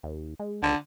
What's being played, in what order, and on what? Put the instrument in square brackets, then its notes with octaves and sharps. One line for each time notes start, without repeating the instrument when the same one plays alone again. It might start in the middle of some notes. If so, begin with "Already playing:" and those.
[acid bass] D#2
G#3
[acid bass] C#2 [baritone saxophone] D3